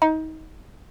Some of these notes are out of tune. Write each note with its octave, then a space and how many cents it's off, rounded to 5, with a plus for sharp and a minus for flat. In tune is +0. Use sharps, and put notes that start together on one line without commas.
D#4 +25